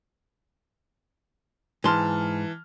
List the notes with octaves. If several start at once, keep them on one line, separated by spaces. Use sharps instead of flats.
G#2 E3 A5 C6 F6